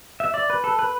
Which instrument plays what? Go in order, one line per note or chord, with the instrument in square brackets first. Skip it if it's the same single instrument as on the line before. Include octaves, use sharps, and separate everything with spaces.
[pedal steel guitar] E5
D5
B4
A4
B4